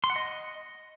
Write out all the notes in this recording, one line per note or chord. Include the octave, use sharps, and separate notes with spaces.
C6
F#5
D#5